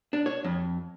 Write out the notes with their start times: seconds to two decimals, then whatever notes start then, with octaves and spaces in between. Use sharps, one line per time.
0.13 D4
0.26 C#5
0.44 F2